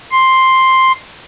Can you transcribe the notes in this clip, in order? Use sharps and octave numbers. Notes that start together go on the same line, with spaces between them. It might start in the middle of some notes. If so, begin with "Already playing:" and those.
C6